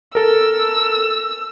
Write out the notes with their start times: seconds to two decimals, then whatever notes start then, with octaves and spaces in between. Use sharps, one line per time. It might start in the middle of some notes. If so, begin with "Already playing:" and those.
0.15 A4 A#4 E6